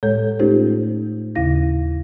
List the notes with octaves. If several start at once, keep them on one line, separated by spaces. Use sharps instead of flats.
A2 G#3 A4 C#5 G6
A3 C#4 D#4 F4 G4 C5
D#2 C#3 E4 F5 A#6